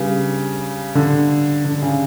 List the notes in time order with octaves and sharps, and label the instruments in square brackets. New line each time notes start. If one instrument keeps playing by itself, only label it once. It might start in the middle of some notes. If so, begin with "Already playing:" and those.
Already playing: [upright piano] C#3 [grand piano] G3 B3 D4
[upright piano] D3
D3
C#3